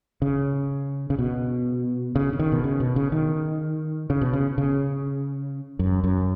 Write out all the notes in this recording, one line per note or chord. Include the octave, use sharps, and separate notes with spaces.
C#3
C#3
B2
C#3
C#3
D#3
B2
C#3
B2
C#3
D#3
C#3
B2
C#3
C#3
F#2
F#2